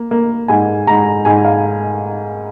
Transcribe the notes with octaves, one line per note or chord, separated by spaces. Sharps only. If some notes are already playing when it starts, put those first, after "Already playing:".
Already playing: A#3
A#3
G#2 G#5
G#2 A#5
G#2 G#5
F5